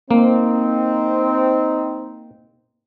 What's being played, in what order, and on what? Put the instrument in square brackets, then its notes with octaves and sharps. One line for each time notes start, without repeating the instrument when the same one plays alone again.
[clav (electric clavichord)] A#3 [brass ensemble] C4 D#4